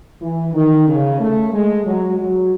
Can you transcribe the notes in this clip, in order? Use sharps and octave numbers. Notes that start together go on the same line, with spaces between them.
E3
D#3
C#3
A3
G#3
F#3
F#3